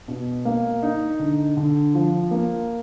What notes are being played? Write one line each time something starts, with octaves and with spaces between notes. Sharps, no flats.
B2
A#3
D#4
D3
D3
F3
A#3